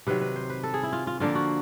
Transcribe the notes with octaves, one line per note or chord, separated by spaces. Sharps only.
C3 D#3 F#3 B4
B4
C5
B4
A4
G#4
E4
F4
F4
D3 F3 A#3 F4
F#4